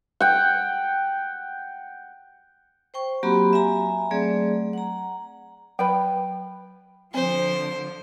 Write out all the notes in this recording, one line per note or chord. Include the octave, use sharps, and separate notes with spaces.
F#5 G5
C5 G5 C#6
F#3 A#3 C4 F#4 G4 B5
E5 G#5 A#5
F#3 A3 C4 G#4 D5
F#5 A#5
F#3 B4 G5 B5
D3 F3 C4 C5